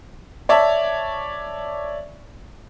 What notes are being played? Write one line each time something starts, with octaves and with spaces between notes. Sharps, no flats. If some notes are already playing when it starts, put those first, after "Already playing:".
C#5 D5 E5 A5